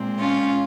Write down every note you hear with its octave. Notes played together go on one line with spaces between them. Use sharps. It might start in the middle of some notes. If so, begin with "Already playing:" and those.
Already playing: A#2 G#3 C4
C#4 F4